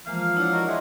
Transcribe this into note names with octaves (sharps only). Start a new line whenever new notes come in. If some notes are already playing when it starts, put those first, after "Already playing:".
E3 F3 G#3 A#3 F5
D4 E4 C#5 F#5
F#4 A#4 D#5
G#4 D5 E5 F#5 C6